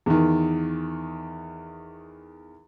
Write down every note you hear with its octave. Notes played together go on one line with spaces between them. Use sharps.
E2 D#3